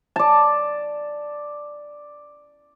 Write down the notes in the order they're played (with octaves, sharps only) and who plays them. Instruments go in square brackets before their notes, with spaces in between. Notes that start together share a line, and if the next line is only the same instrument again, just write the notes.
[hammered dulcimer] D5 A5